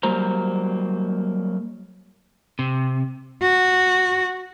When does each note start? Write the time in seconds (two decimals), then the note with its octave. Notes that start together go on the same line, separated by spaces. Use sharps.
0.03 F#3 G3 A#3 C5 A#5
2.59 C3
3.42 F#4